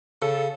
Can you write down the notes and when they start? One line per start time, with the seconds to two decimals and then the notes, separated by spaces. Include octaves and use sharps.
0.22 C#3 A4